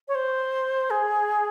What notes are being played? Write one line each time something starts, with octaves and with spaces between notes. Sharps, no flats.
C#5
C5
G#4